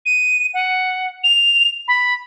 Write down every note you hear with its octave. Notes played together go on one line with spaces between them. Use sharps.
D#7
F#5
F7
B5